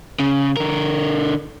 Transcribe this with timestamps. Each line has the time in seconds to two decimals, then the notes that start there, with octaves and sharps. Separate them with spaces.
0.20 C#3
0.57 D3 A#4